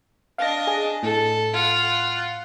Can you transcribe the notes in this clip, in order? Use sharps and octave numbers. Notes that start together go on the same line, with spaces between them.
D4 D#5 F5 A#6
G#4
A2 A4
F4 F#5